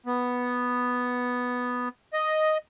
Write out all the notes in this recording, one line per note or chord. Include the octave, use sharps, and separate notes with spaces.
B3
D#5